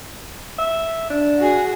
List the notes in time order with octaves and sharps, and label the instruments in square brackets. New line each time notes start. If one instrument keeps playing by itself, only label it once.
[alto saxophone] E5
D4
[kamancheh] F#4 G#4